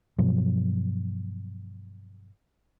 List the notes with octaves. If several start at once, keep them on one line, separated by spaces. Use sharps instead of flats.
G2 B2 F3 F#3